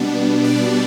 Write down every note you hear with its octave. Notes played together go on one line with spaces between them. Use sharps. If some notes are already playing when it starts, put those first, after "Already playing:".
Already playing: B2 G3 B3 D4
D5